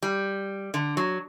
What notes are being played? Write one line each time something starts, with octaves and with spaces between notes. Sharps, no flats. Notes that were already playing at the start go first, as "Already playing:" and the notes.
G3
D3
F#3